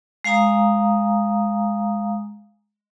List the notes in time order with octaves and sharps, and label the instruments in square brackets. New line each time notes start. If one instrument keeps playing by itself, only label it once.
[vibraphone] G#3 F5 G#5 A#5 D#6